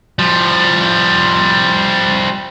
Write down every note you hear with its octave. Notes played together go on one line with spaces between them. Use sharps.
F3 G3